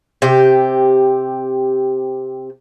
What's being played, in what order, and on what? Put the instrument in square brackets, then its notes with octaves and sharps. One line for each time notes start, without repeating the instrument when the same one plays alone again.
[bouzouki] C3 G4